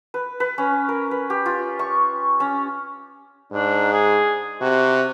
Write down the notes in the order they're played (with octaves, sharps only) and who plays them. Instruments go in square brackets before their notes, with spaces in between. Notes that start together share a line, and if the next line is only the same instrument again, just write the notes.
[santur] B4
B4
C#4
A#4
B4
G4
F4
C#6
C#4
[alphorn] G#2 [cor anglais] D4
[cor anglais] G#4
[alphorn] C3 [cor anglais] F#4